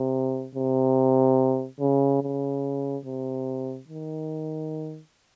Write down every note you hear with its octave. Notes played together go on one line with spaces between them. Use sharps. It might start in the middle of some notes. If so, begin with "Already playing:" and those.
Already playing: C3
C3
C#3
C#3
C3
D#3